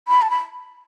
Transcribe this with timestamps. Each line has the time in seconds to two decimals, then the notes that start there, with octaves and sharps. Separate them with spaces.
0.08 B5
0.22 A5
0.30 B5